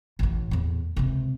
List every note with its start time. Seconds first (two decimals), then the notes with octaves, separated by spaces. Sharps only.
0.19 A1 A2
0.51 E2 A2
0.96 C#2 C3